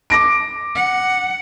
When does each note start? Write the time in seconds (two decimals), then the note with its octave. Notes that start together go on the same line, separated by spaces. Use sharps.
0.10 D6 A#6 D7
0.75 F#5